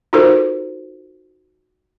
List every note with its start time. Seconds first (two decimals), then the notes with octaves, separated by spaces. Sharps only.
0.13 D#4 F4 F#4 A4 A#4 C5